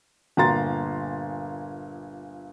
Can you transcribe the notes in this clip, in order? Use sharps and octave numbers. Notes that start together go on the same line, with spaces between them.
G1 A#2 A#5 C6 A6